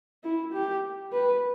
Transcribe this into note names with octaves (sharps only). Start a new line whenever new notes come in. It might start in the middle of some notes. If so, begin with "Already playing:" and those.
E4
G4
B4